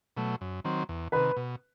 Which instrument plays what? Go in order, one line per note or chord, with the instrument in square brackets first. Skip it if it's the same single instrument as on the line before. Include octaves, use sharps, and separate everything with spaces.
[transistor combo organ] B2 F#3 A3
F#2
D#3 F#3 C4
E2
[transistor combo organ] C3 D#3 [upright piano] B4
[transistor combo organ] B2